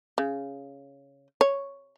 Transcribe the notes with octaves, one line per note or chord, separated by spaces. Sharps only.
C#3
C#5